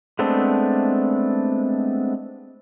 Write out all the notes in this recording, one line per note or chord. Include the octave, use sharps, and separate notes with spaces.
G#3 A3 B3 C4 D4